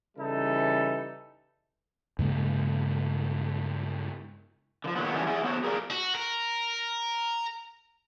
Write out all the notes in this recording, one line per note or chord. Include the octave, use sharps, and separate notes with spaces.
C#3 E3 G3 D#4 E4 A4
G2 C#3 G#3 A#3
D3 F3
A#2 D#3 F#3 B3
E3 F#3 G3 C#4 D4 C#5
E4 G#4 D5 F#5 G#5
F#3 B3 F#4 C5 C#5
G#4 A#4 D5 F5
F#4
A#4